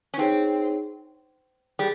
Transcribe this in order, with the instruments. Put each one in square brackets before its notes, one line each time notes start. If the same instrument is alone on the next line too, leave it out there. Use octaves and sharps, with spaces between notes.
[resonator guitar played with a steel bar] C#4
[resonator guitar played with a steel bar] C4 [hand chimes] D#4 G#4 C#5
[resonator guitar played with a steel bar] G3 [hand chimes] G#4